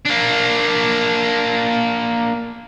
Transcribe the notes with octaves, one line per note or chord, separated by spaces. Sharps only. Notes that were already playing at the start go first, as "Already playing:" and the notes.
A#3 D4